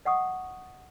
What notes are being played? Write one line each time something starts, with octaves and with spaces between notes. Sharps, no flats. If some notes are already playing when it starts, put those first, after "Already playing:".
D#5 F#5 C#6 D#6